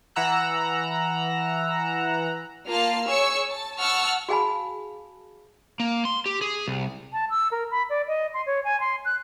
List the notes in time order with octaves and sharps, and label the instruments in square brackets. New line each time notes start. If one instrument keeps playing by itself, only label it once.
[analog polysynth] E3 F#5 A#5 E6 F#6
[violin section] A#3 F4 A5 F6 C7
G#4 C#5 C#6 E6 C#7
A5
F#5 A5 C#6 E6 F6
[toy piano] F#4 G#4 F5 G#5 A5 B5
[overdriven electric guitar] A#3
C6
G4
G#4
C2
[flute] A5
E6
A#4
B5
D5
D#5
C6
C#5
G#5
C6
F#6